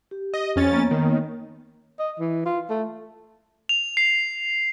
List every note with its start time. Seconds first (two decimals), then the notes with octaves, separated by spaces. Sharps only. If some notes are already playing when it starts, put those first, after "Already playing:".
0.11 G4
0.34 D#5
0.56 F2 C#4 A6
0.73 A#3 B3 C#5
0.91 D#3
1.99 D#5
2.19 E3
2.46 F4
2.70 A3
3.69 F7
3.97 C7